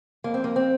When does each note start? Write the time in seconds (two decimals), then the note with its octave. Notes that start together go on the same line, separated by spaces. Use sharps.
0.24 F2 A#3
0.34 C4
0.44 A#3
0.56 C4